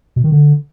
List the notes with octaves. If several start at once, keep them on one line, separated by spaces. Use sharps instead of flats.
B2
D#3
D3